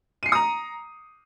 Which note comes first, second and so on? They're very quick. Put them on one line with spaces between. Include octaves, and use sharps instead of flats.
D#7 C7 C#7 D#6 A#5